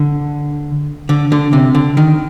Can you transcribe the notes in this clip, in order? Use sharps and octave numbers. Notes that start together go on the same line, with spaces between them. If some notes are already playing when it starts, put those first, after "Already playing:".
Already playing: D3
D3
D3
C3
D3
D#3